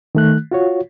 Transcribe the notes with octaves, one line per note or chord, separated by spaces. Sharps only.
D#3 A3 F#6
F4 F#4 C#5